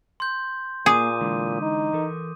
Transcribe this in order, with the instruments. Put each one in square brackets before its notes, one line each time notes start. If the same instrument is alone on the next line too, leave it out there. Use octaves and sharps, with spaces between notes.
[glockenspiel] C6 G6
[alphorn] A#2 [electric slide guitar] A#3 [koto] G#4 [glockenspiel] D6 D#6 D#7
[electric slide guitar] D3 E3 G#3
[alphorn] D#4
[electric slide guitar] E3 A4 A#4